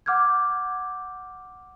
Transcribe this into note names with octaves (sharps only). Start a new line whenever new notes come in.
F#5 D6 F6 G6 G#6